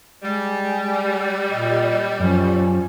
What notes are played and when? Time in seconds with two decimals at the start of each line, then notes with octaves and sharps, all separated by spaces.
0.23 G3 G#3
1.51 A#2 D#5
2.20 F#2 F3 C#4